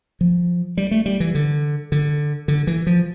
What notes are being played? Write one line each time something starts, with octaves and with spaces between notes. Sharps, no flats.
F3
G3
A3
G3
E3
D3
D3
D3
E3
F3